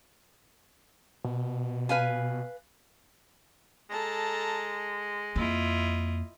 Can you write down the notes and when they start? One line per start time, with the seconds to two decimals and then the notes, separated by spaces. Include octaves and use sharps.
1.24 B2
1.89 B4 F5 G#5
3.90 G#3 A4 A5 A#5
5.36 F2 A#3 E4 F4 D#5